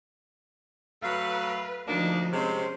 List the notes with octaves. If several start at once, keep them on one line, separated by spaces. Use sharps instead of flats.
F#3 A3 B4 F5
D2 F3 A#3 D4 D#4
C3 G#3 C#4 C5